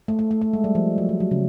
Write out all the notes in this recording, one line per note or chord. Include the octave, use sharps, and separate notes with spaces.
A3
A3
A3
A3
G#3
G3
F3
F#3
G3
F#3
C#3